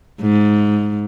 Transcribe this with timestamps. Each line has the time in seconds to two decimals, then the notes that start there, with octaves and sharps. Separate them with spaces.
0.21 G#2